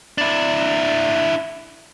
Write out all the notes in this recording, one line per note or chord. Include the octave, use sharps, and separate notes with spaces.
D4 E4